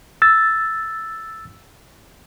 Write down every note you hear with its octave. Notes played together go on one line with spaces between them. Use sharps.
E6 A6